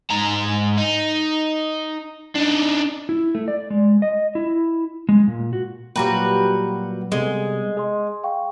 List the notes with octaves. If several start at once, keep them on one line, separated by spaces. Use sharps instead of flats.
G#2 A#5
D#4
D4 D#4
E4
A3
D5
G#3
D#5
E4
G#3
A#2
F#4
A#2 F#3 G3 A#3 F#4 B4 G5 A#5
C3 G3 G#3 B3 A4 D#5
G#4 D#5 C6
F5 G5 C#6